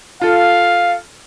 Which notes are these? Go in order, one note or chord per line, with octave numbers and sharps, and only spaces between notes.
F4 A4 F5